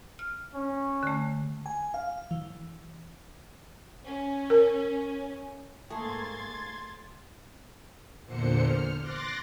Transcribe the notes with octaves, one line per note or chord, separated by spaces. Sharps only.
F6
C#4
D3 A3
G#5
F5
E3
C#4
A#4
G#2 A3 A#3 G#4 C6 G#6 A6
E2 A#2 D3 C5 C#7
F6
C6 D6 F#6 A6 A#6